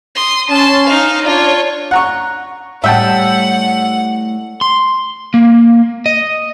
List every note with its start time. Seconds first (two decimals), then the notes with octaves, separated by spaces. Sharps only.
0.15 C6 D#6
0.50 C#4 A5 C6
0.87 D#4 F5
1.25 D4 F4 C#5
1.91 F#5 A#5 C#6
2.84 A2 G3 D#5 E5 F#5 G5 A5
4.61 C6
5.34 A#3
6.06 D#5